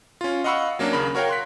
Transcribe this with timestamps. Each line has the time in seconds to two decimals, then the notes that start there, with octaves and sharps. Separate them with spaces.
0.21 C#4 F4
0.44 D#5 F5 F#5 B5 C#6 E6
0.79 F#3 A#3 C#4 D4
0.93 D#2 C#3 A#4 B5
1.15 F#4 A#4 C#5 F5 G5
1.29 C6 F#6 B6